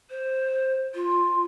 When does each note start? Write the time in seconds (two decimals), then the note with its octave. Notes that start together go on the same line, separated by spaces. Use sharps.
0.10 C5
0.95 F4